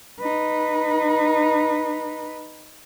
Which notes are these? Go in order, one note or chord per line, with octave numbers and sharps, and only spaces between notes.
D#4 B4